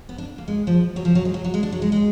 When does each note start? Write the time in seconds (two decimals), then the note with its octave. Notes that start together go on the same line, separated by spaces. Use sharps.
0.09 B3
0.18 D4
0.38 A#3
0.48 G#3
0.67 F3
0.96 F#3
1.05 F3
1.15 F#3
1.25 G#3
1.34 F#3
1.45 F#3
1.54 G#3
1.63 D4
1.72 F#3
1.82 G#3
1.92 G#3